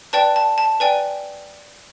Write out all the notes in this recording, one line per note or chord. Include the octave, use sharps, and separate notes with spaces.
B4 D5 G5 A5
A5
A5
B4 D5 G5 G#5